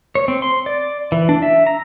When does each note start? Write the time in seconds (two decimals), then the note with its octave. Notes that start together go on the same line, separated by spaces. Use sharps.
0.15 C#5
0.28 C4
0.42 C6
0.66 D5
1.12 E3
1.29 D4
1.42 E5
1.67 A#5